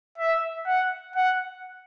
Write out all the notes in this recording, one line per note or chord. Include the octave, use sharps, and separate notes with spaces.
E5
F#5
F#5